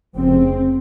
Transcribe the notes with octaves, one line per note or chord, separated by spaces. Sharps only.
F1 F2 C#3 C4